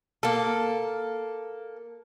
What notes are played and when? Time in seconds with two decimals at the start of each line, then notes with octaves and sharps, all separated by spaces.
0.23 A#3 A4